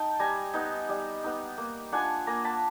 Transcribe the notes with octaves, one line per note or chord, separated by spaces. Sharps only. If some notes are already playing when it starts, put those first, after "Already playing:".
Already playing: D#4 G5 A5
G3 G#5 A#5
B3 D#4
G3
B3 D#4
A#3
D4 F4 F#5 G#5
A#3 G#5 A#5
A5 B5